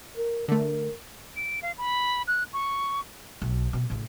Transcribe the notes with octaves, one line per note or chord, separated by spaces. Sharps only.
A#4
D3 A3 A#4
D7
F5
B5
F#6
C#6
B1
B2
A1 C#3